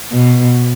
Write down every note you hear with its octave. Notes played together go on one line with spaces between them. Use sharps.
B2